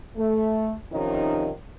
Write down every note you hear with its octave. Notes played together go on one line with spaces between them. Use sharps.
A3
C3 D#3 F3 C#4 D#4